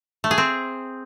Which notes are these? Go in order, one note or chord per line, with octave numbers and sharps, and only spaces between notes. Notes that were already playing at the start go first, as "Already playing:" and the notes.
A3
G#4
C4